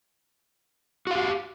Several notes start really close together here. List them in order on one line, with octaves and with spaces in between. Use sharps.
F#4 F5 G4